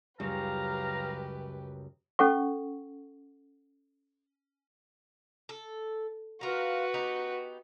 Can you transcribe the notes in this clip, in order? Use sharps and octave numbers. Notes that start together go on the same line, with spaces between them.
C#2 F#2 G3 G4 B4 F5 A#5
C#4 A4 F#5 C#6
A4
F4 F#4 A#4 B4
B3 D#4 G4